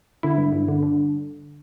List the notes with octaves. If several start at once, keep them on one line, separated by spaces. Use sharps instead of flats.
D3 E4
G2
G2
D3
D3